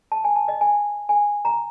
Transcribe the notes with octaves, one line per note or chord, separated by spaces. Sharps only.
A5
G#5
A5
D#5
G#5
G#5
A#5